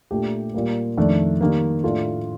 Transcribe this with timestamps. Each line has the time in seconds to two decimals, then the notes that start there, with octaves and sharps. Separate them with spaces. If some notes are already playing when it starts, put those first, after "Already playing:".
0.11 A#2 A3 D4 G4
0.54 A#2 G3 A#3
0.97 F2 D#3 A3 D4
1.41 D#3 G3 A#3
1.84 A2 A3 D4 F4 A4